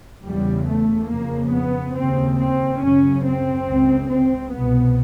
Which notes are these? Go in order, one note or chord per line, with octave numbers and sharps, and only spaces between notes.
E2 C#3 G3
A3
F2 C#3 A#3
B3
D#2 C#3 C4
C4
F#2 C#3 C#4
C4
C#2 C#3
C4
C2 B2 B3